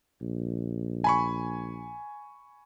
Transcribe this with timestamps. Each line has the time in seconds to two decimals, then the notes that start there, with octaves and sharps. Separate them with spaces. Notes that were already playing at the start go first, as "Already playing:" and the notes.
0.21 A#1
1.04 G#5 B5 C#6